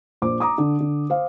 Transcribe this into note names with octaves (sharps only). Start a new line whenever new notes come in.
A#1 C5 D6
A#5 D6 D#6
D3
D3
C5 F5